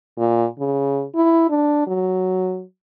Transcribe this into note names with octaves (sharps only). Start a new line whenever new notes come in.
A#2
C#3
E4
D4
F#3